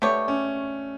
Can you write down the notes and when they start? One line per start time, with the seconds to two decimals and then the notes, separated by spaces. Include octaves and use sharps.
0.02 A3 B3 D4 G4 C#5
0.28 C#4